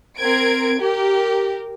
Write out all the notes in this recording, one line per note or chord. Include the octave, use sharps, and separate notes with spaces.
C4 A#4 G#6 D7
G4 A#4